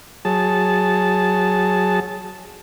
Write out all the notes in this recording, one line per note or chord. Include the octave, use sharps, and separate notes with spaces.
F#3 G#4 A5